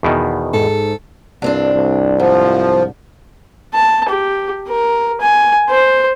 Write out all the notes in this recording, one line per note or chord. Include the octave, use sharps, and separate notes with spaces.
E2 B2 D#3
G#2 A4
C2 G2 C4 D4
C2
G#2 F3
A5
G4
A#4
G#5
C5